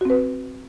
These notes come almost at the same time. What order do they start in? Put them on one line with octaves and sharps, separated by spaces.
F#4 C4 B4